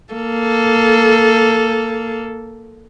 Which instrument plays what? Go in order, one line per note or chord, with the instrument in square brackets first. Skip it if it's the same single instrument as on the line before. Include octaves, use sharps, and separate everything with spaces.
[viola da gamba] A#3 A4